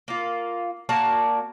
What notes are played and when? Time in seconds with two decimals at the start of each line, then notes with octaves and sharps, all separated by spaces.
0.08 A#3 F4
0.89 A#3 F#4 D5 A5